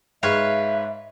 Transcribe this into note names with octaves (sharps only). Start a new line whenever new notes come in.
G#2 B4 C#5 E5 F5